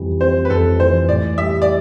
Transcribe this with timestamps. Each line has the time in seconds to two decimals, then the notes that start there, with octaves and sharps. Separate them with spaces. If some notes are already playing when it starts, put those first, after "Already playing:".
Already playing: F2 E3 G3
0.21 C4 C5
0.45 B4
0.50 F2 A4
0.80 E3 C5
1.08 A2 D5
1.38 G3 E5
1.62 D5